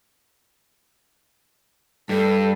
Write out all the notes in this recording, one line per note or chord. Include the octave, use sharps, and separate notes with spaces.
G2 A4